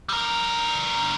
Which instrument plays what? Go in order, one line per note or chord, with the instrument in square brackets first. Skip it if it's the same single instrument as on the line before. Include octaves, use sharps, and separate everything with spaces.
[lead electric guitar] G3 A#4